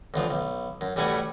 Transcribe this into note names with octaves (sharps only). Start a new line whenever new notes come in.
A1 D2 F3
B1
F#2
A1 G3 A3 F#4 G#5 B5